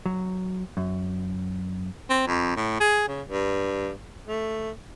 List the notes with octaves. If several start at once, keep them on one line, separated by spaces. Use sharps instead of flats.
F#3
F#2
C4
F2
A2
G#4
C#3
G2
A3